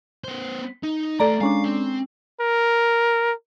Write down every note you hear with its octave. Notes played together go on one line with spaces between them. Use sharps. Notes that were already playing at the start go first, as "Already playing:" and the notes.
B3 C5
D#4
A3 A4 B4 D5 A#5
G#3 C#4 D4 F5
C4
A#4